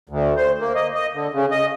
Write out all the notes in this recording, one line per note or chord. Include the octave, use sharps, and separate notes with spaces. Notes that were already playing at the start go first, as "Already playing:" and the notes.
D2
C5
A#3
D#5
D#5
D3
C#3
D#5